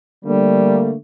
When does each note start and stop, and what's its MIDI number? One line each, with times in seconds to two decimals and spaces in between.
0.25 0.93 50
0.25 0.90 55
0.25 0.93 57
0.25 0.93 58